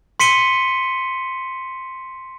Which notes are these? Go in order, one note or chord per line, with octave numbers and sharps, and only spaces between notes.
C6 B6 C#7 D#7 G7